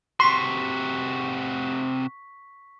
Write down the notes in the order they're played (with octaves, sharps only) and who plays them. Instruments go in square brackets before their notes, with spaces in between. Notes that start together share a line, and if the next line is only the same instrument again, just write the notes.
[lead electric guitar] C3 F#4 [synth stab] C6 [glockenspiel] C#6 B6